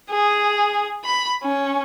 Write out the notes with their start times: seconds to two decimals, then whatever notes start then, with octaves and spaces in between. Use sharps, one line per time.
0.11 G#4
1.05 B5
1.43 C#4